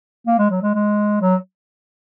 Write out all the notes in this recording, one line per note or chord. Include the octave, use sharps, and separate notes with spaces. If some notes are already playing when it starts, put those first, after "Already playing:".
A#3
G#3
F#3
G#3
G#3
F#3